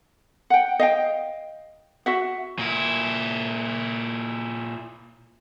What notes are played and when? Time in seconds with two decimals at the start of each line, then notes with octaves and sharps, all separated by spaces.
0.50 F#5 G5
0.79 D#5 F5 G5
2.06 F#4 E5 F#5
2.59 A#2 E4